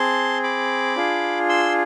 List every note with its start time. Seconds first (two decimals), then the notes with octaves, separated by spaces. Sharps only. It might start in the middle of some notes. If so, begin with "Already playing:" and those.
Already playing: C4 G#4 A5 C6
0.43 B5 D6
0.96 D4 F4 G#4
1.49 C6 E6